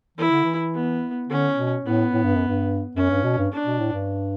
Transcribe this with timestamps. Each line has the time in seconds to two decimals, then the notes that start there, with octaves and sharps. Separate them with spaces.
0.18 E3 E4
0.31 D3
0.44 E3
0.74 B3
1.29 D3 C#4
1.57 B2
1.85 A2 B3
2.13 A2
2.24 G2
2.36 F#2
2.48 G2
2.96 F#2 C#4
3.11 G2
3.24 B2
3.38 G2
3.52 D4
3.66 B2
3.79 A2
3.93 G2